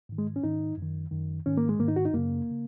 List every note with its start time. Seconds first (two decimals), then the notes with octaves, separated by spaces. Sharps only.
0.09 G#2 D#3
0.18 G#3
0.36 C#4
0.44 G#2 D#3 D#4
0.78 F#2 D#3
1.12 F#2 D#3
1.46 G#2 D#3 C#4
1.57 A#3
1.69 G#3
1.79 G#2 D#3 A#3
1.88 D#4
1.96 F#4
2.06 D#4
2.13 F#2 C#3 A#3
2.51 C#3